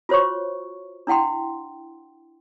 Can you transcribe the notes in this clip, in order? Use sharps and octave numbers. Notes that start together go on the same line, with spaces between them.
F4 F#4 C5 C#5 C#6
D4 E4 F#5 G5 C6